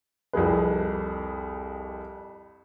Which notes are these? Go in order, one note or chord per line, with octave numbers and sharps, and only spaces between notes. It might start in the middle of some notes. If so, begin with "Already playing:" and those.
C2 F2 G#4 B4